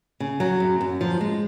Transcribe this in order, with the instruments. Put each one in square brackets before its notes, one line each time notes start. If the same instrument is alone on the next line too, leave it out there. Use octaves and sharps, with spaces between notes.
[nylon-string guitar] C#3
F#3
F#2
F#2
F3
G#3